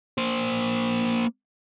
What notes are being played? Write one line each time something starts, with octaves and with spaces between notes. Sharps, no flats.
A#3 C5